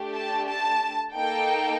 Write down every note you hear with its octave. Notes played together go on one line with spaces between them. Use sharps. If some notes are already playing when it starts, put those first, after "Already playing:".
Already playing: A3 D4 G4
A5
A5
A#3 D#4 A4 G5